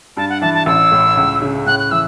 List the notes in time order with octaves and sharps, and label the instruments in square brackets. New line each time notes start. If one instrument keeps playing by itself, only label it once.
[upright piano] G2 [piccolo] A5
[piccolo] F#5
[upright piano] E3 [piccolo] A5
[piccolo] A5
[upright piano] A1 [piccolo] E6
[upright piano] A2
C#2
C#3
[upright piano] A2 [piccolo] F#6
[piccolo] F#6
[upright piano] E3 [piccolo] E6